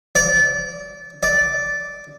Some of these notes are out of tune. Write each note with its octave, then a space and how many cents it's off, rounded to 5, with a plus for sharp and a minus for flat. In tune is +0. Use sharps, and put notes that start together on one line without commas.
D5 -25
D5 -10